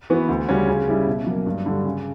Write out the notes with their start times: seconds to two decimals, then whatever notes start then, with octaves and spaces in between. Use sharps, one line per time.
0.10 E3 B3 F#4
0.28 D2
0.48 C#3 G3 C#4 F#4
0.68 C#3
0.88 G3 C#4 E4
1.07 B2
1.27 F#3 A#3
1.46 G2
1.66 D3 G3
1.85 C#3